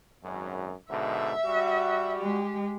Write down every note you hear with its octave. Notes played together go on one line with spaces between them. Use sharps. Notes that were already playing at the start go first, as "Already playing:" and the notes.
G#1 F#2
G#2 B2 D3 E5
G3 F#4
G#3 G4